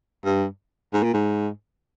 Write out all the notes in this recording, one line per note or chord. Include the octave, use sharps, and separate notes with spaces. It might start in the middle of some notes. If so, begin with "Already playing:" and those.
G2
G#2
A#2
G#2